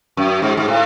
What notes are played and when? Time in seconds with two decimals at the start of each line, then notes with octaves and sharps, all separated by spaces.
0.17 F#2
0.42 G#2
0.57 G#2
0.68 A2